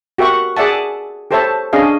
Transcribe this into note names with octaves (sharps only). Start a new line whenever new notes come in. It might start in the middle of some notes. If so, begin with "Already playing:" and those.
F#4 G4 A#4 E5 F#5 C#6
G#4 D5 E5 F#5 A5
G4 A4 C5 C#5 E5 A5
C#4 D4 G#4 D#5 F5